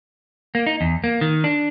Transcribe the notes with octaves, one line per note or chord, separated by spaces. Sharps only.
A#3
D#4
E2
A#3
D#3
D4